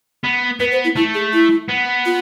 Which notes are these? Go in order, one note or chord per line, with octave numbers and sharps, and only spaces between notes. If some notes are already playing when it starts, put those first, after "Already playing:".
B3
B3 B4
C5
E4
A3 E4
G#4
E4
B3
F4